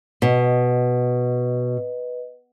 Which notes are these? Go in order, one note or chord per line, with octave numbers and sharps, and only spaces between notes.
B2 B4 D#5